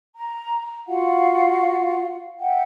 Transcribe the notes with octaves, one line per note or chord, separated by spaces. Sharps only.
A#5
F4 F#4 F5 F#5
E5 F#5 G5